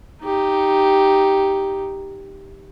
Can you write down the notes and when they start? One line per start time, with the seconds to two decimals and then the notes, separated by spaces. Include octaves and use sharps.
0.22 D#4 G4